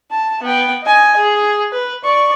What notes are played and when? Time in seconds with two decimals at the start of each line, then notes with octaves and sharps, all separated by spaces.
0.11 A5
0.42 B3 G5
0.83 D#5 G#5
1.16 G#4
1.72 B4
2.04 D5 C#6